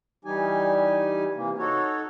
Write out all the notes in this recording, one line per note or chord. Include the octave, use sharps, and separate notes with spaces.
E3 G3 D#4 G4 G#5
C3 E3 A#3
D#4 F#4 A4 C#5